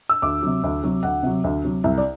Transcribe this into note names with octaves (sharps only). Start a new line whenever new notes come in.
E6
D2 D6
C3 F#3
D2
C3 F#3
D2 F#5
C3 F#3
D2
C3 F#3
C2 E5
D5